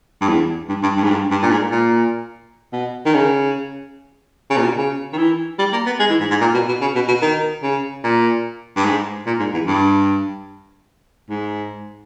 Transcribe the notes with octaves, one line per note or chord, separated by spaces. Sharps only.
G2
E2
G2
G2
G2
G#2
G2
G2
A#2
G#2
A#2
B2
D#3
C#3
C#3
A#2
B2
C#3
D#3
E3
G3
A#3
B3
G#3
E3
G#2
G#2
A#2
B2
B2
C#3
B2
B2
D#3
C#3
A#2
G2
G#2
A#2
G#2
E2
G2
G#2